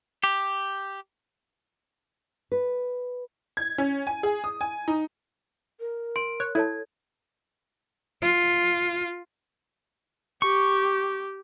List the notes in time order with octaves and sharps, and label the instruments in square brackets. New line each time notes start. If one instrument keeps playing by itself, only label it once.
[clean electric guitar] G4
[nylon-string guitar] B4
[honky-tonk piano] G#6
C#4
G#5
G#4
D#6
G#5
D#4
[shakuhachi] A#4
[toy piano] C6 [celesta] D7
[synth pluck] C#5 [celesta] F#6
[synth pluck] E4 [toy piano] A4 C#5 A5 [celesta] G#6
[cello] F4
[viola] G4 [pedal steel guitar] C#6